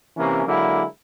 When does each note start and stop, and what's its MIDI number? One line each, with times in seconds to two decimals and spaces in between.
0.16 0.44 48
0.16 0.44 52
0.16 0.44 58
0.16 0.44 61
0.45 0.82 50
0.45 0.82 54
0.45 0.82 56
0.45 0.82 58
0.45 0.82 64